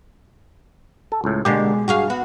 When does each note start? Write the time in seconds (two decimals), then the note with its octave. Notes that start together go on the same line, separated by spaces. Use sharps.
1.12 A4
1.24 C#2 A2
1.45 B2 D3 G#3 A#3 G4
1.88 G2 F#4 G#4 F5
2.10 B3 F#4